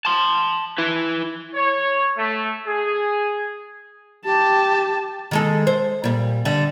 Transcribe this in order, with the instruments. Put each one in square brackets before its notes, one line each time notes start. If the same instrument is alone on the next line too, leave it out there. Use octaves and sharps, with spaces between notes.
[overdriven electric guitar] A5 C6
E4 B4
[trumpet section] C#5
A3
G#4
[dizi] G4 [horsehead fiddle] A5
[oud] D#3 G#3 A4
C5
A#2 G3
D3 G3